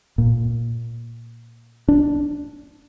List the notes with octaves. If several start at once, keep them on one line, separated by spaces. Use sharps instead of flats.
A#2
D4